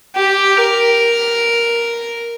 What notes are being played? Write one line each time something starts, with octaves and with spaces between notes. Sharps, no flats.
G4
A#4